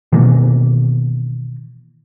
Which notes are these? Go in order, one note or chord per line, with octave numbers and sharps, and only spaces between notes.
B2 D#3 E3 A#3